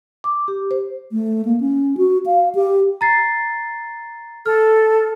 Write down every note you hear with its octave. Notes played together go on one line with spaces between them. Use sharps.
D6
G4
C5
A3
A#3
C#4
F#4
F5
G4
A#5 A6 C7
A4 F6